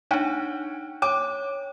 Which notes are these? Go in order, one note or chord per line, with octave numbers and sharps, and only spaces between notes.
D4 D#4 C#5 F#5 G5
C#5 G5 D6